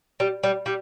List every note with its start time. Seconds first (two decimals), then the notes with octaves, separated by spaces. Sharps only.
0.20 G3
0.44 G3
0.66 G3